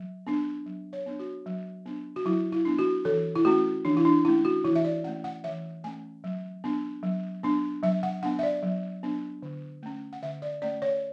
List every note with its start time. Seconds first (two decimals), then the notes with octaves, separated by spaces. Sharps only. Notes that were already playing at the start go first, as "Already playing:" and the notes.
Already playing: F#3
0.27 B3 D4
0.66 F#3
0.93 C#5
1.06 B3 D4
1.19 F#4
1.46 F#3
1.86 B3 D4
2.16 F#4
2.25 F#3 E4
2.52 E4
2.65 B3 D4
2.79 F#4
3.05 E3 A4
3.36 E4
3.45 A3 C#4 F#4
3.85 E3 D4
3.97 E4
4.05 D4
4.25 A3 C#4 E4
4.45 F#4
4.64 E3 E4
4.75 E5
4.85 D5
5.04 A3 C#4 F#5
5.24 F#5
5.44 E3 E5
5.84 A3 C#4 G#5
6.24 F#3
6.64 B3 D4
7.03 F#3
7.43 B3 D4
7.83 F#3 E5
8.03 F#5
8.23 B3 D4 F#5
8.39 E5
8.43 D5
8.63 F#3
9.03 B3 D4
9.43 D3
9.83 A3 C#4
10.13 F#5
10.22 D3 E5
10.42 D5
10.62 A3 C#4 D5
10.82 C#5